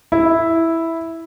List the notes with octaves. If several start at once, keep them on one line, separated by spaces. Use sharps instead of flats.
E4